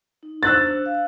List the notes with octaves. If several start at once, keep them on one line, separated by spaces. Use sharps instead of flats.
D#4
D4 C5 E6 F#6 A6
F5